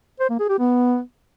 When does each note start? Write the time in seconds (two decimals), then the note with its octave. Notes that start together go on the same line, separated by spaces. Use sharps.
0.20 C5
0.29 A#3
0.39 G#4
0.49 G4
0.58 B3